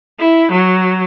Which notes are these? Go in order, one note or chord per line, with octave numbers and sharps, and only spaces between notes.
E4
F#3